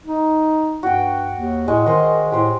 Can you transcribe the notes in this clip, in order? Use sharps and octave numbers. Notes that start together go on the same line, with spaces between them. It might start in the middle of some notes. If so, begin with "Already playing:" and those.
D#4
G2 F#4 G5
D#2
A2 G#3 C#5
D#3 G#4 C5 D#5
A2 G4 C5